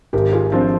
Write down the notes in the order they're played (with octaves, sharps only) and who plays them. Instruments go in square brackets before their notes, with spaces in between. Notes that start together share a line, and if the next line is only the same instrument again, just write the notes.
[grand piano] G#1 [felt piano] G4 A#4
[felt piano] F4 G#4
[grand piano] F3 C4 [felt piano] D4 F4